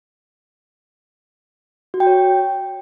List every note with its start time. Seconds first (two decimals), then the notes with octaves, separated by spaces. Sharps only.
1.94 F#4
2.00 G5
2.07 C#5